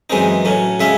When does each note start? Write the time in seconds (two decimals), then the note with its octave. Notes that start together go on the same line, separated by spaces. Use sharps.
0.10 F#2 E3 G#3 C4 D#4
0.45 A2 F#3 C#4
0.80 C#3 G#3 C#4 E5